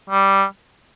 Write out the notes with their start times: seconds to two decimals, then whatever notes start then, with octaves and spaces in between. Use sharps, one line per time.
0.10 G3